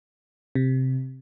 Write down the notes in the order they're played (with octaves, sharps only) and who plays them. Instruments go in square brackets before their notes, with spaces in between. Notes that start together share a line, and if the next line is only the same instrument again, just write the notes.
[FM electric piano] C3